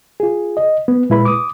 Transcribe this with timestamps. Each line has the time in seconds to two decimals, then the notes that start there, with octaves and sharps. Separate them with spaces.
0.20 F4 G#4
0.57 D#5
0.88 B3
1.10 A#2 G#3 E4 B4 B5
1.25 D6 D#6